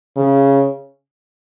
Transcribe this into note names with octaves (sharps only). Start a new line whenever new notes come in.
C#3